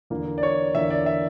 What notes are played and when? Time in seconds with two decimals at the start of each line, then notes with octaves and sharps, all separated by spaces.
0.10 E2 D3 A#3
0.38 D5
0.43 C#5
0.75 E2 D3 A#3 E5
0.90 D5
1.06 E5